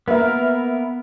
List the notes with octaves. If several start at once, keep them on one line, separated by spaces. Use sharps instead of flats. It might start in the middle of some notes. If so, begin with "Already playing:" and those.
A#3 B3 A#4 B4 E5